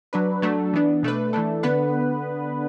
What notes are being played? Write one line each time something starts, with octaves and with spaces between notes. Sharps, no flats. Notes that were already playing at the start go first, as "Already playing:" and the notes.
F#3 D4 B4
F#3 A3 D4
E3 B3 D4
B2 A3 D4 B4
E3 A3 D4 A4
D3 B3 D4 B4